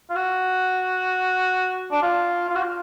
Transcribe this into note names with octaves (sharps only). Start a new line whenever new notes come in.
F4
F#4
D4
F4
F4
F#4
F4